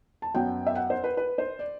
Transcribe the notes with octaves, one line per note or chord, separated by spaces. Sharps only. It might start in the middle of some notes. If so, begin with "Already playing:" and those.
A5
F#2 F#3 B3 G5
E5
F#5
C5
B4
B4
C5
D5